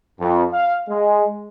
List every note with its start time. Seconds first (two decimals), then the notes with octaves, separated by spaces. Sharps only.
0.20 F2
0.52 F5
0.89 G#3